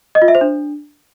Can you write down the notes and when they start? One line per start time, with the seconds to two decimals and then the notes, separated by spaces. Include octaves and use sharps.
0.15 D#5
0.22 F4
0.28 E5
0.35 C5
0.41 D4